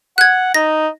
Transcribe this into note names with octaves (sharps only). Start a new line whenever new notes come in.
F#5 F#6 G#6
D#4 A#6